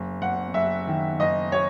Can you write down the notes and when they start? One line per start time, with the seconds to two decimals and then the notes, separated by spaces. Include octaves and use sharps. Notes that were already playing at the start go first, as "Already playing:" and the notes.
Already playing: F#1
0.22 F#1 F#5
0.54 F#1 E5
0.87 D#3
1.20 F#1 D#5
1.52 C#5